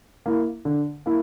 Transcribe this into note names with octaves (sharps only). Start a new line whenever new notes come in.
A#3 E4
D3
A#3 E4